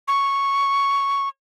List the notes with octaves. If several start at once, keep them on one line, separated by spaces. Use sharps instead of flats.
C#6